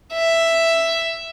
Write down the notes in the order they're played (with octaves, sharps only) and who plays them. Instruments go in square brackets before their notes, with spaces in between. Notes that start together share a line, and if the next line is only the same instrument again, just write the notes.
[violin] E5